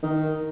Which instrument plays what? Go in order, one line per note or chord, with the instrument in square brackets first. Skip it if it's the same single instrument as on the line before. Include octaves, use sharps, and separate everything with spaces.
[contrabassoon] D#3